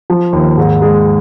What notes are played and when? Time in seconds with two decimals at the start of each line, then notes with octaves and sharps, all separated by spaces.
0.10 F3
0.33 D#2
0.57 G#2
0.82 G#3